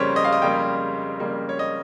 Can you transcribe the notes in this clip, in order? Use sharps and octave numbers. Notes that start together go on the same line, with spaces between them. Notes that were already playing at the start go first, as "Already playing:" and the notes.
Already playing: F2 C#3 G3 A#3 C5 C#5
D#5
F5
D#5
F2 C#3 G3 A#3 G5
F2 C#3 G3 A#3
C#5
D#5